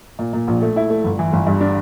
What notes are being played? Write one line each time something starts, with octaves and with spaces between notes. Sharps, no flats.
A#2
A#2
A#1
A3
E4
A3
G1
E3
G1
G2
D4